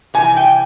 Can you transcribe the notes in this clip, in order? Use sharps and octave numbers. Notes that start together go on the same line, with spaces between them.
C3 E3 G3 G#5
G5